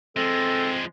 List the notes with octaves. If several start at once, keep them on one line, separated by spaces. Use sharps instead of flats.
F3 G#3 C4 A4